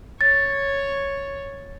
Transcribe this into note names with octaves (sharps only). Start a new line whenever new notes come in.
C#5 A6